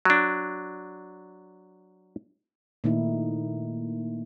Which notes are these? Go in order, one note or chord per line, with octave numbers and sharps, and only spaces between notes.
F#3 D4
A#2 D#3 A3 A#3 D#4 E4